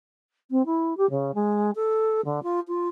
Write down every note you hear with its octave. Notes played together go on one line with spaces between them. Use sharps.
C4
E4
G4
C#3
G#3
A4
D3
F4
F4